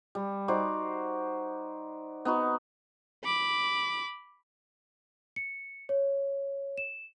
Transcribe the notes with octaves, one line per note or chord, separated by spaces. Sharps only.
G3
D#4 F#4 C5 D5
B3 D#4 F#4
B5 D6
C#7
C#5
E7